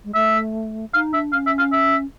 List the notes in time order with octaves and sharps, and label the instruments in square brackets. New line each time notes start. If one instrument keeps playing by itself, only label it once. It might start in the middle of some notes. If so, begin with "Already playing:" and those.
[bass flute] G#3
[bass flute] A3 [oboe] E5
[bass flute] D#4 [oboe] F5
[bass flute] D4 [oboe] E5
[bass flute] C#4 [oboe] F5
[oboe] E5
F5
E5